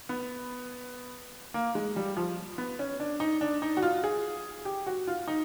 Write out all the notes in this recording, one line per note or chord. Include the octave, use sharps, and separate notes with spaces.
B3
A#3
G#3
G3
F3
B3
C#4
D4
D#4
D4
D#4
F#4
F4
G#4
G4
F#4
F4
D#4